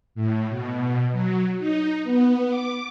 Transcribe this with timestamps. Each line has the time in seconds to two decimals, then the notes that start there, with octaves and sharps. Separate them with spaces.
0.15 A2
0.49 B2
1.12 F#3
1.59 D#4
2.04 B3
2.49 D6